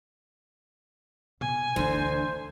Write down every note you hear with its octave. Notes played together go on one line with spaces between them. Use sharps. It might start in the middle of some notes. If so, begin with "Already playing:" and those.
B2 G#5
D2 E3 D4 C5